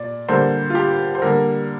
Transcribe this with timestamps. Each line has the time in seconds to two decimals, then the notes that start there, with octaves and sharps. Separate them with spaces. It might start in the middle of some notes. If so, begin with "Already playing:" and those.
Already playing: A#2 D5
0.28 D3 G3 A#3 C5
0.70 F4
0.75 G4
1.15 C5
1.22 D3 G3 A#3 A#4